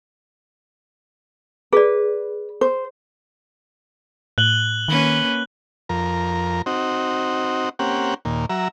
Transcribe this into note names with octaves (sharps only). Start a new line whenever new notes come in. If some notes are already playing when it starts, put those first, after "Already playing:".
G#4 B4 D5
C5
A2 F#6 F#7 G7
D#3 A#3 C#4 B4
F2 A#4
C4 D#4 F#4
A#3 C4 C#4 G4 F#5
D#2 A#2
F#3 E5 A#5